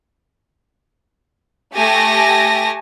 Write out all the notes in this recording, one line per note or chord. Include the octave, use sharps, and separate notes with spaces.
A3 G4 G#5 A5 A#6